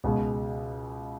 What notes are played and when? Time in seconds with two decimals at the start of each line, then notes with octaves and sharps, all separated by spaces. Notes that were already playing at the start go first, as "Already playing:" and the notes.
0.04 C#2 B2 G#3